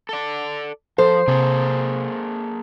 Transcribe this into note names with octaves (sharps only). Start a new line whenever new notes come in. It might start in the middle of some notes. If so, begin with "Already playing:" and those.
A4 D5
F3 A4 C5
C3 A#3 G#4 A4